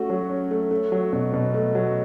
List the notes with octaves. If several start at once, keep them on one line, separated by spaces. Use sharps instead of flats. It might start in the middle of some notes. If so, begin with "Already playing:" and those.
Already playing: A3 C#4 F#4
F#3
C#4
A3
A3
F#3
B2
B2
A3
F#3